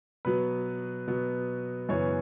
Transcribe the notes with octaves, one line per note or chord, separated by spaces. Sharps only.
B2 F#3 B3 B4
B2 F#3 B3
F#2 C#3 E3 B3 C#5